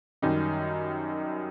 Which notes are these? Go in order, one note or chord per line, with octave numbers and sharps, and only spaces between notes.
F#2 D#3 G3 D#4 G4